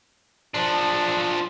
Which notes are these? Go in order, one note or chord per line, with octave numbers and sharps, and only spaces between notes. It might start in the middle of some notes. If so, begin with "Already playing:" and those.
F3 D4